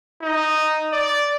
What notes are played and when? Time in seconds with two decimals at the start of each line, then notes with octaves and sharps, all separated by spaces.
0.22 D#4
0.92 D5